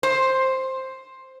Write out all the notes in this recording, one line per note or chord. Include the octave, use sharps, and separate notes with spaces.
C5